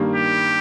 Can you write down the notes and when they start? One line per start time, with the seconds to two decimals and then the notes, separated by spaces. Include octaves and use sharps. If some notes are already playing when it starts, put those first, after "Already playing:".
Already playing: G2 D#3 G3 A#3
0.16 G4